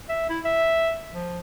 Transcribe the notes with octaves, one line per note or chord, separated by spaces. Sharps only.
E5
E4
E5
F3